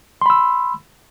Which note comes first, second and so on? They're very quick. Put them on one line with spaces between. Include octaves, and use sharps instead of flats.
C6 B5 E6